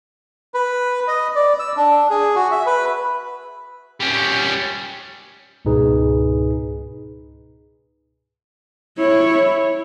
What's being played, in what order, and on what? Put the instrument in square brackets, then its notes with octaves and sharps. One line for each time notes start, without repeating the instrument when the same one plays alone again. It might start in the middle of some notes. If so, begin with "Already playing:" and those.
[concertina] B4
D#5
D5
E6
D4
G#4
F#4
E5
B4
[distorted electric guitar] G3 C#4
[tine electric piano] C#2 G#2 B2 D#4 G#4 B4
[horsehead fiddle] E4 C#5